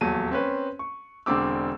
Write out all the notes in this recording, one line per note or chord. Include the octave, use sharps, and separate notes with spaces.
D#1 E2 F#3 A5 D#7
C4 C#4 B4
C#6
E1 D3 C4 D6 E6